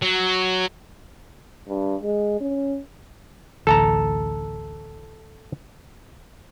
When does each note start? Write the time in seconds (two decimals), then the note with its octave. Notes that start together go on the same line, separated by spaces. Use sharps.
0.02 F#3
1.68 G2
2.02 G#3
2.40 C#4
3.67 A1 D2 A4 A5 A#5